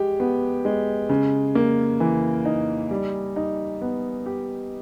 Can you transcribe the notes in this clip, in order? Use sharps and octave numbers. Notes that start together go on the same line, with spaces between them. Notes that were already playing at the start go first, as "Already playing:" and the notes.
Already playing: G#3 G4
B3
G#3
C#3
A#3
E3
D#4
G3
D#4
B3
G4